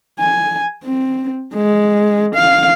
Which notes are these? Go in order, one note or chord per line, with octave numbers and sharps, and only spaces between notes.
G#5
C4
G#3
F5